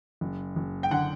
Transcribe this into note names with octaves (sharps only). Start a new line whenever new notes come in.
F#1
F#1
G5
D3 F#5